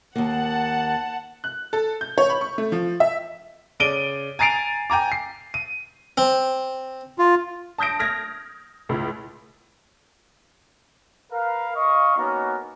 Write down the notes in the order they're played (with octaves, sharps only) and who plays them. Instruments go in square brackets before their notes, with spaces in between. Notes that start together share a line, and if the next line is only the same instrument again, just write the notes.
[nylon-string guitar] D#2 A#3 [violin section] F#5 A5
[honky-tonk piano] F#6
A4
G6
C#5
B5
C#6
A3
F3
E5
[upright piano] C#3 D5 D7 D#7 G7
G#5 A#5 A6 C7 D7 F7
G5 G#5 A#5 D6
C7
D#7
[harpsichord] C4
[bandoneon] F4
[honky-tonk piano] A5 D#6 G6 A#6 D7
F6 G#6 A#6
C#2 A2
[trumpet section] A#4 B4 F5
D#5 F5 C#6
A#3 B3 C#4 D#4 F#4 A#4